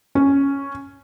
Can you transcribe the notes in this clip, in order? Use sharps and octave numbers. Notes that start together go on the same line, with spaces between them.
C#4